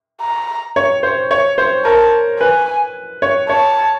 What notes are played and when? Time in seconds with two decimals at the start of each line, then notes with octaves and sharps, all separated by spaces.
0.21 A#5
0.76 C#5
1.03 C5
1.31 C#5
1.58 C5
1.85 A#4 A5
2.39 B4 G#5
3.22 C#5
3.49 C#5 A5